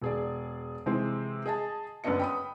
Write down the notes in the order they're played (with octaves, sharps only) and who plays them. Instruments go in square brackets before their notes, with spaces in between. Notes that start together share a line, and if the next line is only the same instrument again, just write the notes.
[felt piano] E1 G#4 D5
C3 E3 G#3 C4
G#4 D#5 G#5 A5
F#1 B3 C#4 D4 D#5 C#7
G5 B5 D#6